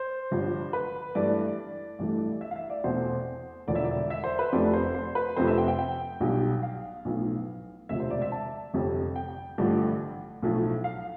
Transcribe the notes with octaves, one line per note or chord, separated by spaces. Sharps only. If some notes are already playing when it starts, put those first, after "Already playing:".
Already playing: C5
G1 G2 F3
B4
G2 E3 A3 D5
A1 G2 E3 A3
E5
F5
E5
D5
E2 B2 A3 C4 C5
E1 E2 D3 F3 D5
E5
D5
E5
C5
B4
F1 F2 C3 F3 A3 D5
C5
C5
B4
F2 C3 F3 A3 C4 C5
E5
G5
G5
G5
B1 B2 G3
F5
B1 A2 F3 B3
E1 D2 C3 F3 E5
C5
D5
E5
A5
G1 F2 C3 G3
G5
A1 G2 D3 F3 A3
B1 A2 F3 A3
F5